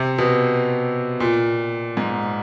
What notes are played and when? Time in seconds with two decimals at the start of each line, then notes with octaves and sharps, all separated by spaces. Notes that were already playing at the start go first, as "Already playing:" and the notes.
Already playing: C3
0.18 B2
1.20 A#2
1.97 G#2